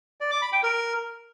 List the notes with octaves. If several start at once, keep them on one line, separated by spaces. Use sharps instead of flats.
D5
D6
B5
G5
A#4